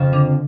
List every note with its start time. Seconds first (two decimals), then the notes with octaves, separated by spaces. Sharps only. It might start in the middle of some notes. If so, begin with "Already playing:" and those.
Already playing: F2 C#3 F3
0.13 D3